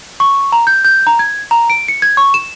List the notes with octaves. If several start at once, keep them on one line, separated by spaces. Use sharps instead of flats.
C#6
A#5
G6
G6
A#5
G#6
A#5
D7
C#7
G#6
C#6
E7